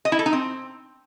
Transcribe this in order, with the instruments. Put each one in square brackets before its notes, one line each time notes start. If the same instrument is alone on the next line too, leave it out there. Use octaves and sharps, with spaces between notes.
[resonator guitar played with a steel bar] D#5
E4
A4
D#4
C4